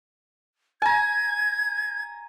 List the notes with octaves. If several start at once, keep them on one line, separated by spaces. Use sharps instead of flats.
G#5 A#5 G#6